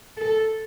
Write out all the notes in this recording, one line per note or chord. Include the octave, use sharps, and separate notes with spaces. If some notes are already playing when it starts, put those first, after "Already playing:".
A4